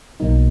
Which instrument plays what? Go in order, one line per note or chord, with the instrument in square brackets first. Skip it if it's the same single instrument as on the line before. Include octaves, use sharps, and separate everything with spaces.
[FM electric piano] B1 B2 F#3 A#3 D#4